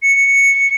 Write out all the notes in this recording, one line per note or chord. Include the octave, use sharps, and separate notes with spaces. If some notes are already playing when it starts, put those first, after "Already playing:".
C#7